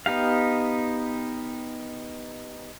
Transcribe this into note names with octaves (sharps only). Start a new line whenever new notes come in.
B3 D#4 G4 F5